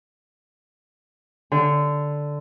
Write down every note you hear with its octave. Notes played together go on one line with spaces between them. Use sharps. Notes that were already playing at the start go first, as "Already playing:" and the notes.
D3